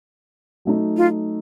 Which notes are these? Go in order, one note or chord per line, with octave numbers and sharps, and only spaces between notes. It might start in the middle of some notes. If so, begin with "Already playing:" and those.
F#3 A3 D#4
F4